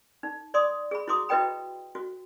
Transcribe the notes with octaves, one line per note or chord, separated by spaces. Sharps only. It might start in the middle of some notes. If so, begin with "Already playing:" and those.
D#4
D5 C6 D6 D#6
G#4 B5
E4 F#4 C6 D6 D#6
E4 F#4 B4 D#5 G5 B5
F#4